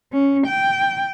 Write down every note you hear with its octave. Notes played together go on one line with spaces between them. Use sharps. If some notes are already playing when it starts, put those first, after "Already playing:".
C#4
G5